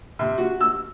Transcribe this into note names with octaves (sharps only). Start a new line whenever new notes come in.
C3
F#4
E6